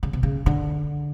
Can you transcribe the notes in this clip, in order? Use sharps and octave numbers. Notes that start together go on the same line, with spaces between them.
C#3
C3
C#3
D3